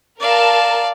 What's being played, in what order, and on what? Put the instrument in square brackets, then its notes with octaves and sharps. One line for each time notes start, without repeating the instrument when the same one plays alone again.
[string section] A#4 A5 [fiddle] D5 F5